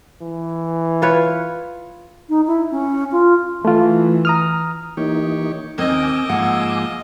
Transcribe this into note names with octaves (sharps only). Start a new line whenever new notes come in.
E3
F4 B4 C#5
D#4
E4
C#4
F4
E3 A3 F4
A#5 D#6 F6
E3 A#3 D#4 G4 C#5
D#2 C4 A#4 D#5 G5 G#5 D6 E6
G#2 F3 A#3 F5 F#5